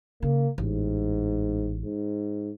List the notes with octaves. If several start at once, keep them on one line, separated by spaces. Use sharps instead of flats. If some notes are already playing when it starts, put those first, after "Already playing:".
C#3 A#3
A1 G#2
G#2